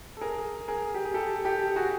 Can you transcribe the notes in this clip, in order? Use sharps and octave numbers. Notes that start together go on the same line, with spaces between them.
A4
G#4 A#4
G#4 A#4
G4
G#4
G4 A4
G4 A4
F#4 G#4